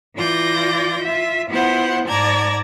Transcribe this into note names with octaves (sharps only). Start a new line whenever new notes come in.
E3 F4 D5 G6 A#6
F4 E5
B3 E4 F4 C5 F#5
G#2 D5 A5 A#5 G#6 A#6